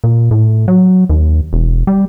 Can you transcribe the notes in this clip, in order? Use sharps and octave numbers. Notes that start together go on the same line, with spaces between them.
A#2
A2
F#3
D#2
E1
G3